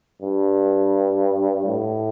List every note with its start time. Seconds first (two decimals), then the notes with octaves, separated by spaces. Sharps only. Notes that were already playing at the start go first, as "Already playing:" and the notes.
0.21 G2
1.66 A2